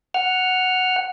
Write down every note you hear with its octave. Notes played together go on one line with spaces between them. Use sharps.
F#5 F6